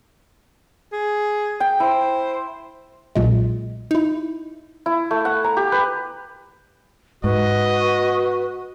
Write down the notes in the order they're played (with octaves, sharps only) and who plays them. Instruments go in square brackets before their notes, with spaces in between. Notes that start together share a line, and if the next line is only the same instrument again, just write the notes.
[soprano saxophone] G#4
[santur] G5
[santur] E4 [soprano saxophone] C5
[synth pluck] B1 A#2 G#3
D#4 E4
[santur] E4
A3
F#5
A#5
G4
B4
[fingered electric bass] G#2 [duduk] F#4 [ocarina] B4 [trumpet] D#5